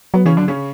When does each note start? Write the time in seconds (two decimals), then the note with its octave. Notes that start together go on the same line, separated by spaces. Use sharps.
0.14 F#3 B3
0.25 C#3 E3 C#4
0.37 D3 F#3 D4
0.48 C#3 C#4